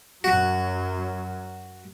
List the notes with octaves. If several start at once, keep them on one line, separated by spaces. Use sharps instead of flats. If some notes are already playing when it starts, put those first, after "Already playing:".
F#2 F#3 F#4